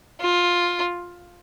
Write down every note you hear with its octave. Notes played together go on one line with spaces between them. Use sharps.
F4